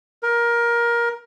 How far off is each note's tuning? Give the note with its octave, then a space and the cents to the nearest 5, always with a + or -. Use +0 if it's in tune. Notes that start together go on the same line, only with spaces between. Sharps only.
A#4 +20